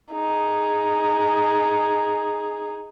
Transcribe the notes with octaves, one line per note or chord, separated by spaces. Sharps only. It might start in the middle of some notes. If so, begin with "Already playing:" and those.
D#4 G#4